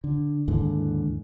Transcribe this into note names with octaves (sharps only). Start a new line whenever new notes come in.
D3
D#2 G#2 D3 E3